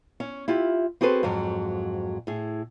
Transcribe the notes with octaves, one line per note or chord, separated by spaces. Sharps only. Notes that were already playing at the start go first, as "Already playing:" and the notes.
C#4
E4 F4 G4
C4 F#4 G#4 A4 B4 C5
F2 G#2 F#3
A2 G#4